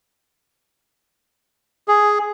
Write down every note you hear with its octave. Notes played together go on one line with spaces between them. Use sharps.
G#4